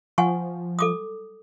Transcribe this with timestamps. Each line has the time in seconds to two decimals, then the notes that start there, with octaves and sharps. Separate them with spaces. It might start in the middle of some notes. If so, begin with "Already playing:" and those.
0.18 F3 F#5 G#5 C#6
0.79 A4 D6 D#6